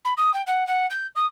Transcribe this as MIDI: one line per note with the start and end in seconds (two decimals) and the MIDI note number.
0.04 0.13 83
0.17 0.33 87
0.33 0.42 79
0.46 0.66 78
0.67 0.86 78
0.90 1.07 91
1.15 1.25 87